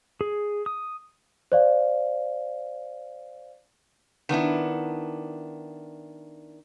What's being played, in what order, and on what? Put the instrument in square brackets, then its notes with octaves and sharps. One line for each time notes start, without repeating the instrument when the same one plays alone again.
[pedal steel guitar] G#4
D#6
[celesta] C5 D5 F5
[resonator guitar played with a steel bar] D#3 B3 D4 E4